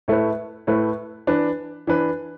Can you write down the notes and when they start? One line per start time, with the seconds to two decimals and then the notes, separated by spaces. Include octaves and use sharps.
0.08 A2 A3 E4 B4
0.67 A2 A3 E4 B4
1.27 E3 D4 B4
1.87 E3 D4 B4